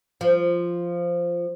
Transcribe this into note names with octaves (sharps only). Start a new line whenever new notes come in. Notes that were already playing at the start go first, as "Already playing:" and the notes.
F3